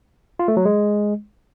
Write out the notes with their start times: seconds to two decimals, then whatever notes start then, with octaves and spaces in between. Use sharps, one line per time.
0.39 F4
0.48 A3
0.57 F#3
0.65 G#3